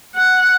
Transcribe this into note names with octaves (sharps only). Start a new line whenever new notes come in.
F#5